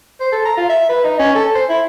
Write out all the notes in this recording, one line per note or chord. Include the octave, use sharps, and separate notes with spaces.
C5
A4
A#5
F4
E5
B4
D#4
C#4
A4
C5
E4